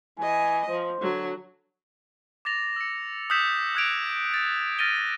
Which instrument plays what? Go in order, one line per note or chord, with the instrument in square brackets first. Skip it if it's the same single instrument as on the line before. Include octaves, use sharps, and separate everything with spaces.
[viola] E3 D#5 [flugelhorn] G#5
[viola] F3 [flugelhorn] C5
[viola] D3 F#3
[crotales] D6 A6 A#6 F7
E6 C#7
D#6 E6 F#6 G6 B6 E7
D6 F#6 G#6 A#6 D7 F7
A6
F6 A6 A#6 D7 D#7 G7